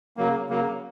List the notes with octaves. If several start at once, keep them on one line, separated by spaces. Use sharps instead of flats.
C#3 F#3 A#3
C#3 F#3 A#3